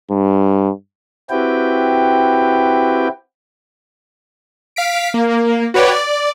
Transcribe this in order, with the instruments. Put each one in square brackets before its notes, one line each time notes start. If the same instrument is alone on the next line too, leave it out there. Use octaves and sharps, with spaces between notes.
[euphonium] G2
[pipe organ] C4 E4 F#4 G4 B4 G5
[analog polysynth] F5 B6 D7
A#3
F#4 B4 C#5 D5 G5
D5